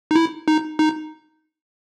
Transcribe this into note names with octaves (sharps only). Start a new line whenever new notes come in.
D#4
E4
D#4
D#4